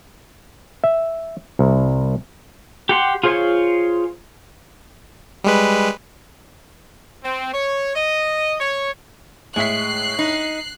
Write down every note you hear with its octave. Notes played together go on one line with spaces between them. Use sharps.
E5
C2
G4 F#5 C6
F4 G#4 C5 C#5 F5
G3 G#3 B4
C4
C#5
D#5
C#5
A2 G#3 E5 F#6 B6 C7
D#4